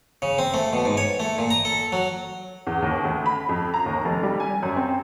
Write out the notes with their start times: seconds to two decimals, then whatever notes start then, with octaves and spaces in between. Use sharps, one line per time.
0.22 C#3
0.38 C4
0.54 A3
0.73 B2
0.85 G#2
0.97 C#5
1.20 A3
1.38 A#2
1.51 A#5
1.65 A4
1.92 F#3
2.67 E2
2.82 D#2
3.04 D2
3.26 B5
3.49 F2
3.74 A#5
3.86 D#2
4.05 F1
4.23 G3
4.40 G#5
4.63 F#2
4.76 C4